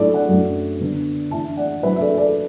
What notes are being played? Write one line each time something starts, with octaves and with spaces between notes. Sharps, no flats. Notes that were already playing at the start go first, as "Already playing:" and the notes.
Already playing: A2 F#3 D4 A4 D5
D5 F#5
F#2 F#3 A3 D4
D3 B3 D4
A2 E3 D4 E5 A5
D5 F#5
A2 F#3 D4 B4 E5
E5
A4 D5
A4 D5